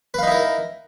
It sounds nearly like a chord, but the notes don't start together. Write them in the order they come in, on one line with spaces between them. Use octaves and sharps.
B4 F5 D#4 E4 A#4